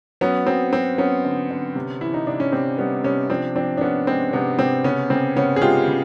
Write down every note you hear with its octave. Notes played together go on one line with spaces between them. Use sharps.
F#3 B3 C#4
F#3 C4
F#3 C4
F#3 B3 C#4
D3
D3
C3
E3 E4
D#4
C3 D4
C#4
C3 C4
G3 B3 C#4
C3 B3 C#4
F3 C4 D4
F3 C4 D4
D4
C3 B3 C#4
G#3 C4
C3 B3
C3 C4
C#3 B3 C#4
C#3 C4
C#3 B3 C#4
G#4
G#3 F4 G4
C#3